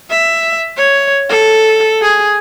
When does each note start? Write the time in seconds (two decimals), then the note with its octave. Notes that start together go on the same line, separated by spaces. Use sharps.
0.10 E5
0.77 C#5
1.29 A4
2.02 G#4